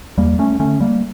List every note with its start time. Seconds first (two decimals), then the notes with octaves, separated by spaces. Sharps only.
0.18 E2 G3 A#3
0.39 A3 C#4
0.59 D3 A3 C#4
0.80 G3 A#3